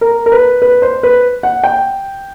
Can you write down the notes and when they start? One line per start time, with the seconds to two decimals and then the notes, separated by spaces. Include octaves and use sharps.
0.01 A#4
0.26 A#4
0.32 B4
0.62 B4
0.82 C5
1.03 B4
1.43 F#5
1.64 G5